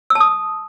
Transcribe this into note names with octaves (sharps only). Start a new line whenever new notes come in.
E6
A5
D#6